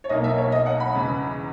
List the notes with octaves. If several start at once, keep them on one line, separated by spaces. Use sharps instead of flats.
C#5
B1 B2 A#3 D#4 D#5
E5
C#5
D#5
F#5
B5
E2 C#3 E3